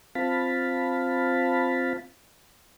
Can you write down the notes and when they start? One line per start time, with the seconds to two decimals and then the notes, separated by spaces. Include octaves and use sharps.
0.15 C4 F4 F5 A5 B5